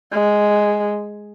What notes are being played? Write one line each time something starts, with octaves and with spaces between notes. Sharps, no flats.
G#3